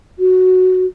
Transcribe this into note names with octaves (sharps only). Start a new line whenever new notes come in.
F#4